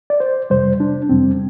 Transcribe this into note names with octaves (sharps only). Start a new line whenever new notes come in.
D5
C5
F2 C3 G3 C5
D4
F2 C3 G3 C4